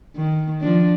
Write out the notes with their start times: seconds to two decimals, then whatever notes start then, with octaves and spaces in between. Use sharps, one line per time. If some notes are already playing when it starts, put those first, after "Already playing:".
0.16 D#3
0.61 F3 D4